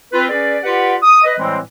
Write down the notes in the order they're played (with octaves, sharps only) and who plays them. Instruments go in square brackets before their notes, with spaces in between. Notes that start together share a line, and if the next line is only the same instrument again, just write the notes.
[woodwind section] C4 F4 B4
C#4 G#4 B4 D5
F4 G4 B4 D5 F#5
D#6
B4 D#5
A2 E3 G3 G#3 C4